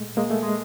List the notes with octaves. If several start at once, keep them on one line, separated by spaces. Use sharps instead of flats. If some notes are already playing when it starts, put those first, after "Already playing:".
Already playing: A#2 G#3 A3
G#3 A#3
A3
G#3